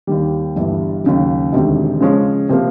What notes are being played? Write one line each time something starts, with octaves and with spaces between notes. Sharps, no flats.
D#2 D#3 G3
G1 G2 E3 G3
D#2 C#3 F#3
E1 D2 C3 D#3
C#3 F3 G#3 C#4
C3 F3 A#3